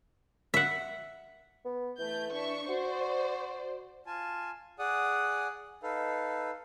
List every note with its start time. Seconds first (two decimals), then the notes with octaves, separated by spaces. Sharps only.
0.54 E5 F#5
1.65 B3
1.99 E3 A3 G6
2.33 D4 E5 C#6
2.69 F#4 C5 D5
4.06 F4 G#5 A5
4.79 G#4 D5 F#5 D#6
5.83 D#4 A4 B4 F5